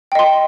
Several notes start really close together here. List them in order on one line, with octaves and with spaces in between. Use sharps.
G5 D#5 C6